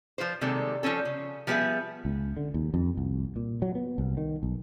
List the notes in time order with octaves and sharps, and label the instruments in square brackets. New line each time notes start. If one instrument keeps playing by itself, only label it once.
[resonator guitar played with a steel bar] F3 F4 B4 C5
C3 D#3 G3 G#3 A#3 A4
F3 G3 C#4 A4
C#3
F3 G3 B3 G#4 B4 E5
[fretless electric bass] C#2
D3
D#2
F2
C2
A#2
F#3
B3
C2
D#3
B1